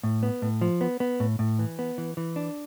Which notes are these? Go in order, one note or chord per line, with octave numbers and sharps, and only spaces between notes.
A2
B3
A2
F3
B3
B3
A2
A2
E3
B3
E3
E3
D4